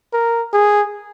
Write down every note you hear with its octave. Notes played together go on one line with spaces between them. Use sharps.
A#4
G#4